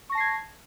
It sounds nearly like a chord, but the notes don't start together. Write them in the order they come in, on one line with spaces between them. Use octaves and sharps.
C#6 A#6 A5 C7 G#6